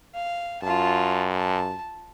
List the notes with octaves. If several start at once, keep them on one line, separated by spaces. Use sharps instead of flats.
F5
F#2 F4 A5
A5